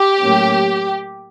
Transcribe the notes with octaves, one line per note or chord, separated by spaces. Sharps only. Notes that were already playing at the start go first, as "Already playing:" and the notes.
Already playing: G4
A2 F#3 A#3 C#4